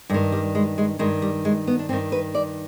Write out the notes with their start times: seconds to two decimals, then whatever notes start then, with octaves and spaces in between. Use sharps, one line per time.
0.09 G2 G#3
0.14 D#3
0.32 G3
0.55 G#3
0.78 G#3
0.99 G2 D#3 G#3
1.22 G3
1.45 G#3
1.67 B3
1.79 D4
1.89 G2 D#3 C4
2.12 B4
2.35 D5